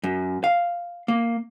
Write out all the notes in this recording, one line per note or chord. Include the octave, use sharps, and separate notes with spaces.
F#2
F5
A#3